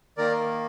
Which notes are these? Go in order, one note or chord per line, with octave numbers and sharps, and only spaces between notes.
D#3 A#3 A#4 D5